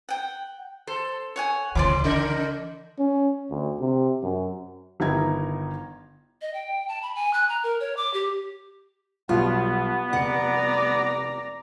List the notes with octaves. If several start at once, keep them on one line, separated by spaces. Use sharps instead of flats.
F#5 G5
A4 C5
C#5 F#5 G#5
D2 C#3 E3 D5 C6 D6
C#3 E3 A#4
C#4
D2
C3
F#2
G1 D#3 D#4 E4 A#5 G#6
D#5
G5
A5
B5
G#5
F#6
A#5
A#4
C#5
D6
G4
B1 B2 G3 B3 F4
F1 D5 F#5 A#5 C#7